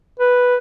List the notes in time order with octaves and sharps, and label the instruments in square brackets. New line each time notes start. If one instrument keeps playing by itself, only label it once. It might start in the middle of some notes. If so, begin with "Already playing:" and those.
[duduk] B4